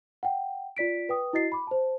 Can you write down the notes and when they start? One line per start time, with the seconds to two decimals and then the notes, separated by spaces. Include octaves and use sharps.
0.23 F#5 G5
0.77 F4 D5 B6 D7
1.09 B4 G5 D#6
1.33 E4 F#4 D#5 A6 C7
1.52 B5 D6
1.67 C5 A5